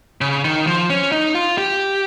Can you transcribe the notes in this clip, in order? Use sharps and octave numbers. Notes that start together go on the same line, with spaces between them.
C#3
D#3
F3
C#4
D#4
F4
G4